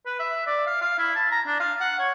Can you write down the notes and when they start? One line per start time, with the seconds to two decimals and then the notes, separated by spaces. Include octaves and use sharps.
0.06 B4
0.20 E5
0.47 D5
0.67 F5
0.81 F5
0.99 E4
1.15 A5
1.31 A#5
1.47 D4
1.60 F5
1.80 F#5
1.99 C#5